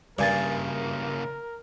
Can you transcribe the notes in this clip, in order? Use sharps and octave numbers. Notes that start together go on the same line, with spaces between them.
G2 C#3 A#3 A#4 D5 G#5 A6